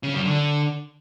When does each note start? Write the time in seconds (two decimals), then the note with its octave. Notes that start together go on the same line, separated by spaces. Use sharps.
0.03 C#3
0.14 F#2
0.25 D3